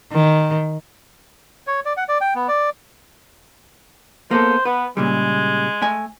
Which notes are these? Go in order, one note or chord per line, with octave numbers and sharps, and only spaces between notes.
D#3
C#5
D5
F#5
D5
G5
B3
D5
A#3 B3 A4 C5
B3 B4
A#2 C#3 G3 G#3
A3 G#5